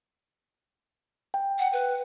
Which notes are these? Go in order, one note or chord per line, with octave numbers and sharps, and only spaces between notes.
G5
F#5
B4